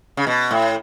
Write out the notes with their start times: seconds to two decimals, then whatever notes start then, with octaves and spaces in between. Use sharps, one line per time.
0.17 C#3
0.27 B2
0.51 A2